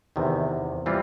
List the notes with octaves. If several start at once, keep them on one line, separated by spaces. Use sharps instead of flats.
E2 C3 D#3
E3 G3 C4 F4